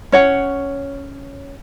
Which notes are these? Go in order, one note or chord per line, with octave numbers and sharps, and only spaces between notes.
C#4 C#5 F#5